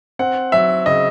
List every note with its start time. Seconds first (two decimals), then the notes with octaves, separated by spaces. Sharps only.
0.19 C4 F#5
0.52 F#3 E5
0.86 C#3 D#5